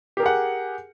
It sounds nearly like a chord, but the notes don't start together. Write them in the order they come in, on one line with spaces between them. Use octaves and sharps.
G4 A#4 G#4 F#5